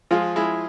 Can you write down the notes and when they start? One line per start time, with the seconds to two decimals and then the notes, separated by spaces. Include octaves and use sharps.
0.11 F3 G#3 F4
0.36 G#3 E4